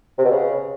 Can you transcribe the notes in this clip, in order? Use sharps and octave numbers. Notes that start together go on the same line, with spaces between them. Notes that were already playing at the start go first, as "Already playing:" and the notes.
C3
B2
C#3